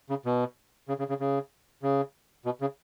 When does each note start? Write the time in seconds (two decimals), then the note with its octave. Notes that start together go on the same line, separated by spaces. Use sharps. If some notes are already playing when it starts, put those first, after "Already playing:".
0.10 C#3
0.25 B2
0.88 C#3
0.99 C#3
1.09 C#3
1.20 C#3
1.83 C#3
2.45 B2
2.61 C#3